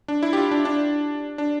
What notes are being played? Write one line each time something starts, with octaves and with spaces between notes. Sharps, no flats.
D4
E4
G4
F4
D4
D4
D4